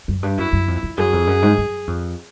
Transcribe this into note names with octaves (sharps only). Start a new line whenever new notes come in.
F#2
G2
F#2 E4
F#2
F2
F2
F#2 G#4
F2
F#2
G#2
F#2
F2